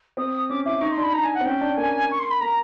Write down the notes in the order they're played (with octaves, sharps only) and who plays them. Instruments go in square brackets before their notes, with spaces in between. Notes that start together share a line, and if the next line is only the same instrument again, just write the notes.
[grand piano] C4 [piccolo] D#6
[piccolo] D#6
[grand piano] C#4 [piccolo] D6
[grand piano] E4 [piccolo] D6
[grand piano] D#4 [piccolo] C#6
[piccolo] C6
[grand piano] D4
[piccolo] B5
[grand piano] D4 [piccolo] A#5
[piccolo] G#5
F#5
[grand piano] C4
[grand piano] C#4 [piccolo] G5
[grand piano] D4
[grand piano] A#3 [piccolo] G#5
[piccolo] C#6
C6
B5
[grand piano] A#3 [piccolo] A#5